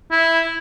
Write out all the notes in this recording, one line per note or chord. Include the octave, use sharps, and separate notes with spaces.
E4